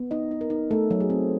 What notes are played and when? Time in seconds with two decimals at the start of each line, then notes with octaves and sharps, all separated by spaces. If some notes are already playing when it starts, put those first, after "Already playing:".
Already playing: B3
0.11 D#4 D#5
0.31 D#4
0.41 A#4
0.50 D#4
0.71 A3 A4
0.91 F#3
1.00 G#4
1.10 C4